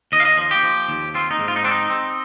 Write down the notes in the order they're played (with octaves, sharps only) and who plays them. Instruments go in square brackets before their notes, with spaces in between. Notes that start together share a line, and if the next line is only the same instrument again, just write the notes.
[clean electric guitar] D#2 D#5
F5
D#5
F3
G4
F3
D#2
C4 F4
D#4
G#2
F4
D#4
C4 D4
D#4
C4